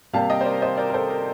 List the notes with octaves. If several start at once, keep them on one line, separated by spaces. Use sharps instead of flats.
C3 G3 A#3 F5 A5
D#5 G5
C5
A#4 D5
C5 D#5
A#4 D5
A#4
A4 C5
A#4